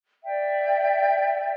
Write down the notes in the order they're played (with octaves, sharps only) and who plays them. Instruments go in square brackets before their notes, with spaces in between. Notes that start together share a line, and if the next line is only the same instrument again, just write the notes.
[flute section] D5 E5 G5